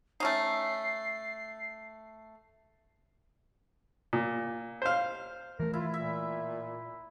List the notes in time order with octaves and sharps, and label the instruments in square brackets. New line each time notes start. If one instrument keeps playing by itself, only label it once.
[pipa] A3 C#4 D#4 [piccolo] C7
[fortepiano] A#2
C5 F5
[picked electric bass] E3 A3 [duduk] A#4
[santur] E4 [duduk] F4
[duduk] A#2 [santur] E5